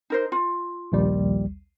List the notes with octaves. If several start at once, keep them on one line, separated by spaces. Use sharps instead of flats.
D#4 A#4 C5
F4
A#1 D#2 G3